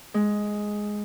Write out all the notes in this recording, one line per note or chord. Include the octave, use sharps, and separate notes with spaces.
G#3